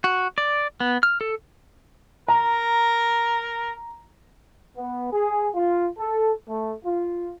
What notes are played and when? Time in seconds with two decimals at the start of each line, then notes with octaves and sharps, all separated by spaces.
0.04 F#4
0.38 D5
0.80 B3
1.03 F6
1.21 A4
2.28 A#4 A#5
4.77 B3
5.12 G#4
5.54 F4
5.98 A4
6.48 A3
6.84 F4